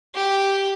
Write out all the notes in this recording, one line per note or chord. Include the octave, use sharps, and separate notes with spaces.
G4